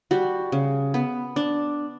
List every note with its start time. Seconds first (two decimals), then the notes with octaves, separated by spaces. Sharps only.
0.11 G3 F#4
0.52 C#3
0.94 B3
1.36 D4